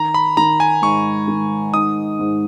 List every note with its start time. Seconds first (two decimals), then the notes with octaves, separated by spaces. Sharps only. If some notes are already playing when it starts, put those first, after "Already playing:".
Already playing: D#3 A#5
0.14 B5
0.37 D#3 A#5
0.60 G#5
0.82 G#2 C#6
1.28 D#3
1.74 D#4 D#6
2.19 G#2